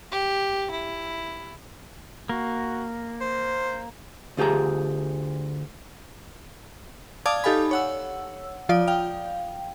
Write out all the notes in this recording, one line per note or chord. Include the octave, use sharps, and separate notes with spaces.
G4
E4
A#3 F#4
C5
D2 F4 G4 G#4 A#5
D5 F5 A5 D6 D#6 G#6
D#4 G4 A4 F5 G#5 B5
C#5 F#5 E6
F3 F4 D5 D#6
F5 G5